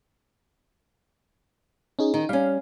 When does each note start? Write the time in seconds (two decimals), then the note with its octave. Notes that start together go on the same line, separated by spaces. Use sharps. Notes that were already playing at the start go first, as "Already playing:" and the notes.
1.99 C#4 D#4 G#4
2.14 D#3 D#4
2.29 G3 C#4 F5